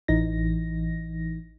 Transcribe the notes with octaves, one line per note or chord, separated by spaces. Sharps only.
A1 E3 D#4 A#6